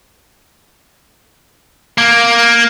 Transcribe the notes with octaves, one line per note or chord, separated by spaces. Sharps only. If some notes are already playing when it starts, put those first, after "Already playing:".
A#3